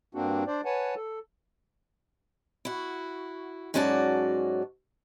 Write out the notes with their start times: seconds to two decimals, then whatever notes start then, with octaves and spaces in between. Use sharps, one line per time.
0.15 G2 A#3 C4 D4 F#4
0.47 D4 C5 D5
0.65 B4 C#5 F#5 G#5 A5
0.96 A4
2.65 E4 F#4
3.74 G#2 F#3 C#4 F#4 D5 A5